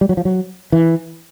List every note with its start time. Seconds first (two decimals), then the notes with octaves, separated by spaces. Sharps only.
0.01 G3
0.09 F#3
0.17 F3
0.25 F#3
0.72 E3